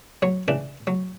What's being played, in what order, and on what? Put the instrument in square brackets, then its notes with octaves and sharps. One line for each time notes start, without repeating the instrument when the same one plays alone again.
[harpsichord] F#3 C#5
C#3 E3 D4
F#3